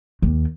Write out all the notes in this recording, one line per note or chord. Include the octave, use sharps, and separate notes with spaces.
D#2